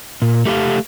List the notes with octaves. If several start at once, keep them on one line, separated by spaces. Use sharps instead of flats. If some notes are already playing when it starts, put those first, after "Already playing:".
A#2
A3 G4 D#5 F5